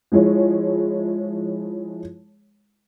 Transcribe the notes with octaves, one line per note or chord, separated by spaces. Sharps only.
F3 G#3 E4 C#5